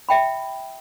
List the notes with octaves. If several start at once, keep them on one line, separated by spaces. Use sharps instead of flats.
E5 G5 B5